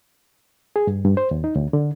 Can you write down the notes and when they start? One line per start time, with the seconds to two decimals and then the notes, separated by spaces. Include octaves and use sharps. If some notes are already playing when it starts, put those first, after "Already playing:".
0.76 G#4
0.87 G2
1.05 G2
1.17 C5
1.31 D#2
1.44 D#4
1.56 D2
1.73 D3